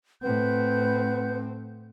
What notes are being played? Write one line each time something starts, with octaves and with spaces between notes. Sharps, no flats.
A2 C4 B4 F#5 G6